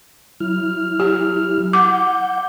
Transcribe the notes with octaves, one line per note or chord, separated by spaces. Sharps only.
F#3 E4 F6
G4
F#5 D6 G6